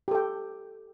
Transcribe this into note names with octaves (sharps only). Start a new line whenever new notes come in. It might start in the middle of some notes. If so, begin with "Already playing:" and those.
G4 A4 G5